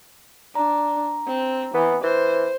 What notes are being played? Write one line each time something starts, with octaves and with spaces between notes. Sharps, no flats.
D4 A#5
C4
E3 B3
E3 C5